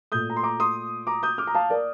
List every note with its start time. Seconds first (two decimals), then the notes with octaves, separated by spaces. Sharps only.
0.12 A#2 A3 D#6 G6
0.30 A#5
0.37 C6
0.43 A#5 D6
0.60 C6 D#6
1.07 A#5 D6
1.23 D#6 G6
1.38 D6 F6
1.47 A#5
1.55 F5 A5
1.70 A#4 D5